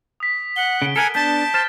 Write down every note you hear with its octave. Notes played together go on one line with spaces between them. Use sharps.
D#6 B6
F#5 G7
C#3 D7
A4 A#4 F#5 G#5
B3 D4 A5 G6 B6
C5 F6 A6 E7